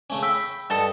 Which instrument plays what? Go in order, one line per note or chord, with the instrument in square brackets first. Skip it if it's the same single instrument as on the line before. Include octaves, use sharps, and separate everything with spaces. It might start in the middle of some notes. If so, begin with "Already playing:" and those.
[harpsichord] C#3 A3 C#4
[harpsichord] G5 [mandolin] B5 [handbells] E6
[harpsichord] G2 [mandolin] A4 D#5 A5